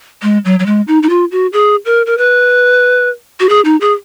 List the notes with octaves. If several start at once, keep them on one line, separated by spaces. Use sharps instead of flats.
G#3
F#3
F#3
G#3
D#4
D#4
F4
F#4
G#4
A#4
A#4
B4
F#4
G#4
D#4
G#4